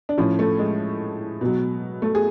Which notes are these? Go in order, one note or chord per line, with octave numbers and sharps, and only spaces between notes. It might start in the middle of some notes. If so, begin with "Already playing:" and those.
D4
A2 F3 C#4
A3
G#3
B2 F#3
A3
G#4